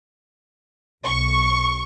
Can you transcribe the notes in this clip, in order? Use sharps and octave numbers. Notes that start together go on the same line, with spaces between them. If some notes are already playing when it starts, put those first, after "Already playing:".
B1 C#6